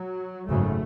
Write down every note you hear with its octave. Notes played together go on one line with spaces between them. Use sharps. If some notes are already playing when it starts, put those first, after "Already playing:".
Already playing: F#3
G#1 F#2 C#3 A3